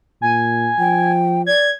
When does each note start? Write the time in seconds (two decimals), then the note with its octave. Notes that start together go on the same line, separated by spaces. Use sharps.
0.22 A#2 G#5
0.79 F3 G5
1.46 D5 G#6